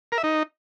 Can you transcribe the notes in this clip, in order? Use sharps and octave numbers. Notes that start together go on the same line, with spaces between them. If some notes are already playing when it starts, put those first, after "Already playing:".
A#4
E5
D#4